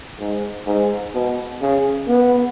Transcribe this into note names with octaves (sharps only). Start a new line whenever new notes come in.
G#2
G#2
B2
C#3
B3